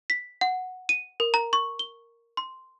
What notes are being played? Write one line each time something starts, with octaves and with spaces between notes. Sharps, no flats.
B6
F#5
D#7
A#4
A#5
C#6
G7
C6